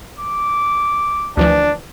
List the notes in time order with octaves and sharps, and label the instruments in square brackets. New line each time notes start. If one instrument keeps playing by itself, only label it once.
[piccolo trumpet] D6
[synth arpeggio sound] D2 E3 F3 [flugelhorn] D4